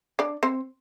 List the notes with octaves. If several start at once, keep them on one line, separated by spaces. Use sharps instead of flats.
D4 D5
C4 C5